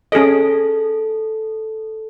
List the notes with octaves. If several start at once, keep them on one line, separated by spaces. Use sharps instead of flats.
C#4 G#4 A4 D#5